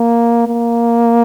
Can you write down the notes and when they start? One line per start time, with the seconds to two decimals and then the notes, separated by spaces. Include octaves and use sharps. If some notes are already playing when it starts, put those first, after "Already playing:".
Already playing: A#3
0.47 A#3